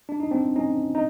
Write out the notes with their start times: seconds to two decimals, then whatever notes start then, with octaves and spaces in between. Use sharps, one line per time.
0.09 D4
0.20 D#4
0.31 C4 D4
0.56 C#4 D#4
0.95 D#4